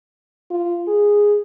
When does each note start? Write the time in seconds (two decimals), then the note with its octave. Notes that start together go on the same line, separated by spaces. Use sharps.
0.51 F4
0.88 G#4